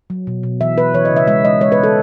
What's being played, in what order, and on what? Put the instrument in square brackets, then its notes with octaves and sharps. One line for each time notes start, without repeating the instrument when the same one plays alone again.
[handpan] F#3
B2
B2
E3 E5
E3 B4
E3 C#5
D#5
C#3
E5
G#3 E5
G#3 D#5
G#3 C#5
B4
G#3
A4